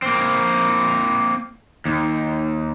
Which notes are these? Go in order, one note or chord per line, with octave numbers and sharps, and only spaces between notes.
A#3 C4
D#2